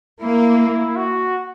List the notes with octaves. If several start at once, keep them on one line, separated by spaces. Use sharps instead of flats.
A#3 E4
F#4